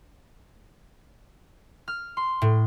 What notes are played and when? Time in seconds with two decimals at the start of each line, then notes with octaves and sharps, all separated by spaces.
1.88 F6
2.17 C6
2.42 A2